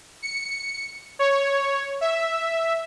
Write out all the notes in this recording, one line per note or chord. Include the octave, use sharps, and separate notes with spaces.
C#7
C#5
E5